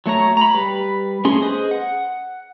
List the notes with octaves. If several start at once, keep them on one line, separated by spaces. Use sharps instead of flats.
F#3 A3 C#5 A#5
A#5 B5
G3 B4
A3 C#4 G#4 C6
G#4 B4 C5 D#5 D#6
F#5